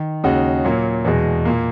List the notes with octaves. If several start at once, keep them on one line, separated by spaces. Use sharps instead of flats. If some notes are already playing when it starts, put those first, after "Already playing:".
Already playing: D#3
D#2 C#3 G#3 D#4 F#4
A#2 F#3 A#3
E2 B2 G#3
A#2 A#3